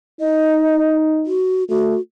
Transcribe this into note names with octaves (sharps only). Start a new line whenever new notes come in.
D#4 D#5
F#4
A3 F#4